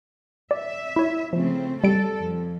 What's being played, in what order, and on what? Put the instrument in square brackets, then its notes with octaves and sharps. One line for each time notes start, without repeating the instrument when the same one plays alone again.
[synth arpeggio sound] D5 [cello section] E5
[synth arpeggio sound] E4 C#5
[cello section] C#3 A3 C4 [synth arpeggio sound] F3
[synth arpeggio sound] G3 D7 [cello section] A4
[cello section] F2